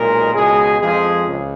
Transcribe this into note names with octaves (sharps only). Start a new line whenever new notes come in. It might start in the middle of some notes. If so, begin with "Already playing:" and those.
Already playing: B1 A#2 G#3 A#4
C#2 B2 G#3 G#4
F2 F3 G#3 G#4
C#2